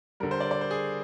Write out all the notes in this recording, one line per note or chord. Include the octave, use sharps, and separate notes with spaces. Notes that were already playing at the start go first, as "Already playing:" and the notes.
D3 G3 A#4
C5
D5
D5
C5
G#4